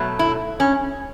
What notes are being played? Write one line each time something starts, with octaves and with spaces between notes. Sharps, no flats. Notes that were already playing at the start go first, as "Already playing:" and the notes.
Already playing: B2 F#3 A3
E4
C#4